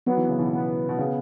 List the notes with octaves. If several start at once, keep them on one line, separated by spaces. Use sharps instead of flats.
F#3 B3
E3
C#3
B2 E3
B3
B2
C#3